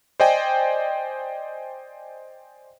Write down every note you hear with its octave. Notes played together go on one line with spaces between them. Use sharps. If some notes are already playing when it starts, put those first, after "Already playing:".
C5 D5 D#5 G5 G#5